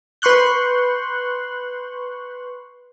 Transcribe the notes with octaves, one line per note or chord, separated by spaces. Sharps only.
B4 C6 C#6 F#6 G6